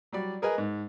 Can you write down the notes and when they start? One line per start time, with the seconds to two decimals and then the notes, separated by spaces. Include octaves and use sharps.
0.12 F#3 G3 D5
0.42 G#4 A#4 B4 D#5 G#5
0.58 G#2